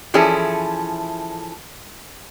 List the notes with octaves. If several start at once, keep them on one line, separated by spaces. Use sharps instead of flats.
E3 F3 C#4 E4 G#4 A4